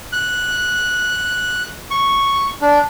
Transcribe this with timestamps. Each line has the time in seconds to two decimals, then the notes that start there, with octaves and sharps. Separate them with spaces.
0.13 F#6
1.91 C#6
2.62 D4